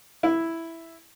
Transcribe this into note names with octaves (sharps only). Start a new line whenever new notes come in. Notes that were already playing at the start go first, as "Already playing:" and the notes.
E4